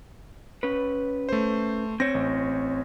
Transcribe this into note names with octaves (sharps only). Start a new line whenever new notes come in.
C#4 B4
A3 C5
C4 C5 C#5 A#6
A1